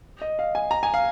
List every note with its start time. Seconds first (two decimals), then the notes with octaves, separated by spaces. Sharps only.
0.22 D#5
0.39 F5
0.55 G#5
0.71 A#5
0.83 G#5
0.94 F5